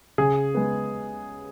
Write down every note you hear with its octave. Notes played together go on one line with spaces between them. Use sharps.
C#3 G#4
G#3 B3